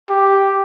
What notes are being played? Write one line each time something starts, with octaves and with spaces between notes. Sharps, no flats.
G4